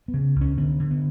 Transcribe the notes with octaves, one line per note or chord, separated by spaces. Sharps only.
B3
C#3
C#2
C#4
D3 B3
D3
B3